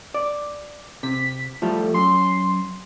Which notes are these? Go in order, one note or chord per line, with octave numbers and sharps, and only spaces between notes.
D5
C3 B6
F3 G3 A3
F#2 C6